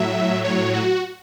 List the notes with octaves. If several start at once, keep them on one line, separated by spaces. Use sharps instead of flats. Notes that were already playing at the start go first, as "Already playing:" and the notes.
Already playing: A2 F#3 E5
C#5
F#4